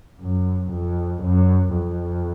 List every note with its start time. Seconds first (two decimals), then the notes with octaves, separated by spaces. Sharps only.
0.21 F#2
0.72 F2
1.22 F#2
1.73 F2